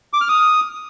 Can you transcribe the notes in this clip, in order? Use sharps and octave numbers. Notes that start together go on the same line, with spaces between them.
D6
F6
D#6